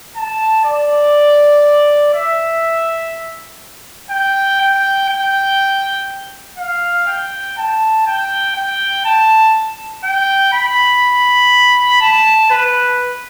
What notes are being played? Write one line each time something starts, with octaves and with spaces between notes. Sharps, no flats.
A5
D5
E5
G5
G5
G5
F5
G5
A5
G5
G5
A5
G5
B5
A5
B4